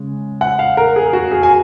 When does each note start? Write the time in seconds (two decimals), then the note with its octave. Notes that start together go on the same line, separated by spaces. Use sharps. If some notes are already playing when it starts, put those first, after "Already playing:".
Already playing: C#3 G#3
0.41 F#5
0.59 F5
0.77 A#4
0.96 G#4
1.13 F#4
1.31 G#4
1.43 G#5